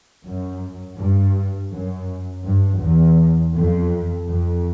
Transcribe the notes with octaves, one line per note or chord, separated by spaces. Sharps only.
F#2
G2
F#2
G2
E2
F2
F2